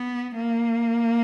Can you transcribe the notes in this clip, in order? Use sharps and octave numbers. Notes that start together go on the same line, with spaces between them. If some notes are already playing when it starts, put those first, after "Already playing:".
Already playing: B3
A#3